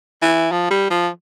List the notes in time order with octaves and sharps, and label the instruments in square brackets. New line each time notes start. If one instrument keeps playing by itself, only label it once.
[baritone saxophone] E3
F3
G3
F3